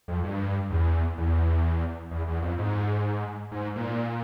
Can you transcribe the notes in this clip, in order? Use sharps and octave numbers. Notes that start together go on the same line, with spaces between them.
F2
G2
E2
E2
E2
E2
F2
G#2
G#2
A#2